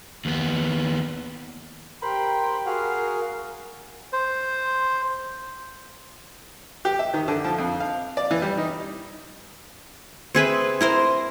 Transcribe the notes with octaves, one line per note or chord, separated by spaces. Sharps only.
D#2 B3
G4 A#4 C5 G5 B5
F#4 G#4 A#4 F5
C5
G4
E5
D#3
D3
F3
F2
F5
D5
E3
G3
D#4
C4 G#4 B4 E5
E4 A#4 C5